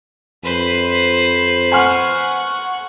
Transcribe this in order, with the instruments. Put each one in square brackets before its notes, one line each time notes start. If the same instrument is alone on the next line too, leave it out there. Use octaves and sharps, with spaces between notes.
[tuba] F2 [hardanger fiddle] B4 C5
[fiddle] F#5 C#6 [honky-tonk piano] G#5 C6 F6